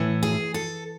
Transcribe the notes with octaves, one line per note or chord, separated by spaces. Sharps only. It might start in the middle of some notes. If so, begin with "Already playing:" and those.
Already playing: A2 E3
G#4
A4